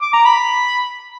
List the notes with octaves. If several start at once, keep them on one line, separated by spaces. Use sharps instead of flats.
D6
A#5
B5